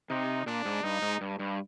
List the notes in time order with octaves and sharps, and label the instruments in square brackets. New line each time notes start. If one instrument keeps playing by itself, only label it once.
[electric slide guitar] C3 [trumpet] D#4
[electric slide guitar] A#2 [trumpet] D4
[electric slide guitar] G#2
[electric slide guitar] G2 [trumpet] D#4
[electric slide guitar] G#2
G2
G2